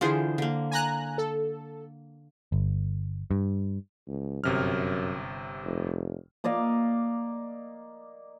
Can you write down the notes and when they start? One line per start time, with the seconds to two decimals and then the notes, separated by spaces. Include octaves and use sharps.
0.01 D3 E3 F4 G#4 C5
0.38 D3 A#3
0.71 G#5 A#5 F#6
1.18 A4
2.52 G1
3.31 G2
4.08 C#2
4.44 G1 F#2 C3 F6
5.65 F1
6.44 A#3 D5 D#5 F5